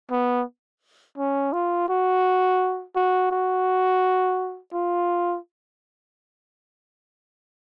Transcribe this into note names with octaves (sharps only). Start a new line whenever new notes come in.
B3
C#4
F4
F#4
F#4
F#4
F4